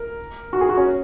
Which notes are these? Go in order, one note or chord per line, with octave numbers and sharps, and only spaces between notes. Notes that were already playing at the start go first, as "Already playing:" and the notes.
Already playing: A#4
F#4
G#4
F#4
C#4